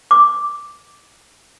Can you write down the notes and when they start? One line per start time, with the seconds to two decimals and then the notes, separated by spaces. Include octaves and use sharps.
0.11 D6